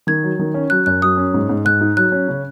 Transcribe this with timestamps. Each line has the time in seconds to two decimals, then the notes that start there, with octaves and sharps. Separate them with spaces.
0.07 D#3 G#6
0.23 F#3
0.39 D#3
0.54 C#4
0.70 F#3 F#6
0.86 F#2 F#6
1.02 F#3 D#6
1.17 C#4
1.34 G#2
1.49 G#2
1.65 G#2 F#6
1.81 D#4
1.97 F#3 F#6
2.12 C#4
2.28 C#3